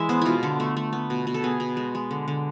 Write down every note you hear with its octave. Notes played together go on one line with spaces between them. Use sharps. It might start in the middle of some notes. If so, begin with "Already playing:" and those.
Already playing: E3 G#3 E5
B3 C5
B2 E4 F4
D3 A4
A3
A3
B3
B2
B2
A4
B3 G#4
B2
G#3
G#3
D3
D3